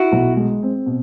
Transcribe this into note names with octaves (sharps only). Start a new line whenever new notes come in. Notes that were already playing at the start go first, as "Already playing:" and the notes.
Already playing: E4 F#4
B1
G#3
C4
B2